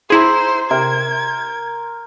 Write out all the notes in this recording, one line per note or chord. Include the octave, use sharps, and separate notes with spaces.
E4 G#4 C5 A#5 C6
C3 A#4 G#6